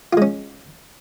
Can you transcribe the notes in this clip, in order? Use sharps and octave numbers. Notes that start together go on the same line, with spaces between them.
G#3 C#4 F4